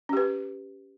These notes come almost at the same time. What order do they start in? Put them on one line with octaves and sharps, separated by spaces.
C#4 G4 B4